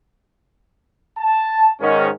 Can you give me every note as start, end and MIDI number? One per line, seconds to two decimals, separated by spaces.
1.18 1.71 81
1.81 2.09 44
1.81 2.09 51
1.81 2.09 61